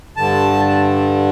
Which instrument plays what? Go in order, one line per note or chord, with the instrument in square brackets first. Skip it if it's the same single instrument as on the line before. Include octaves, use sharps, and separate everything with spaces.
[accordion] G2 D3 A5